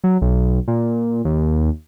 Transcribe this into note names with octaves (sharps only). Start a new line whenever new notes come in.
F#3
B1
A#2
D#2